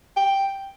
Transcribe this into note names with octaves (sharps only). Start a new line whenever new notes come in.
G5